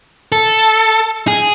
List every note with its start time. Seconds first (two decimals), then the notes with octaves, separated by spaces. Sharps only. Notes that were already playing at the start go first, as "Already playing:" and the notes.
0.32 A4
1.28 G#4